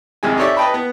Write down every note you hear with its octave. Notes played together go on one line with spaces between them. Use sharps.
A#1 D#2 C3 G#3 G#5
D#4 G4 A4 C#5 D5 E5
B4 D#5 G5 A5 B5
B3